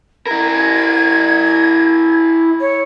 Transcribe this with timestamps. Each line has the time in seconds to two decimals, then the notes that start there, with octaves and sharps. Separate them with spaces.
0.27 E4 A#4 G#6
2.60 C#5